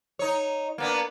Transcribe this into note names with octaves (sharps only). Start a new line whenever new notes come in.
D#4 C#5
A#3 B3 D4